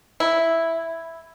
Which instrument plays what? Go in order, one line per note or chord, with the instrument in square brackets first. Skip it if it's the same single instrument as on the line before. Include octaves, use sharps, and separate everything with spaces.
[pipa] E4